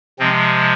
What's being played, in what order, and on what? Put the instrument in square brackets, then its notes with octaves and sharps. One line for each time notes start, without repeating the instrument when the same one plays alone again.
[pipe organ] C3 F3 G#3 C4